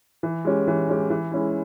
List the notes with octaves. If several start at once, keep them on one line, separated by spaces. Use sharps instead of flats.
E3
G#3 C#4 G4
E3
G#3 C#4 G4
E3
G#3 C#4 E4